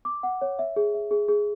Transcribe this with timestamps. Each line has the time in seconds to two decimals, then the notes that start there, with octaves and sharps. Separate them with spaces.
0.05 D6
0.23 F#5
0.41 C#5
0.59 E5
0.76 G#4
0.94 E5
1.11 G#4
1.28 G#4